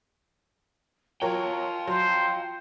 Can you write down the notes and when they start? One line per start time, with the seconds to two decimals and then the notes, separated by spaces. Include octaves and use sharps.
1.22 F#3 F4 A#4 C#5 F5 G5
1.87 F#3 C5